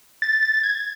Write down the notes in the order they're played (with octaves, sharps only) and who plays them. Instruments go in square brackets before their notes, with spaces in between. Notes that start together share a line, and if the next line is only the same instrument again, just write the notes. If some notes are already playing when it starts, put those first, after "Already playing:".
[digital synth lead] A6
A6
G#6